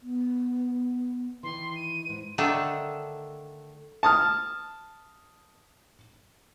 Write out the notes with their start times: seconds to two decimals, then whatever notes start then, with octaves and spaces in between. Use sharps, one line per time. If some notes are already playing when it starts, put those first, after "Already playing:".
0.02 B3
1.43 D#3 E3 C6
1.76 D#7
2.09 G#2
2.38 D3 D#3 A3 D4
4.03 A5 D#6 F6